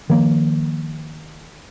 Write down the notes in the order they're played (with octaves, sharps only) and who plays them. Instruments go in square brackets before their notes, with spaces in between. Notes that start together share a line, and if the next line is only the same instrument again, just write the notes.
[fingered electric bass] D#3 F3 A#3